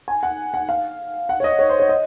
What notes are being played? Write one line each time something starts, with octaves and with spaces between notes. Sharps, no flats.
G#5
F#5
F#5
F5
F#5
C#5
D#5
C#5
C5
C#5
D#5